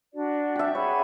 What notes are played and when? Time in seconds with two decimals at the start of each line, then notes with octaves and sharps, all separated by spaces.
0.13 D4 F#4 D5
0.56 G4 E5
0.75 G#4 C#5 F#5 B5